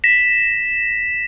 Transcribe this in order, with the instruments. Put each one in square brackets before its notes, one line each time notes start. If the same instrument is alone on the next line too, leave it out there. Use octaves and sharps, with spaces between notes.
[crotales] A#6 B6 E7